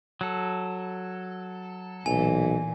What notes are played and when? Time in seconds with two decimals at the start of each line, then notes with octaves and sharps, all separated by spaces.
0.21 F#3 A4
2.06 B1 A#2 E3 G#5